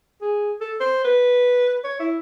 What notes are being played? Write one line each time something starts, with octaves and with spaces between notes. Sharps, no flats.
G#4
A4
C5
B4
C#5
E4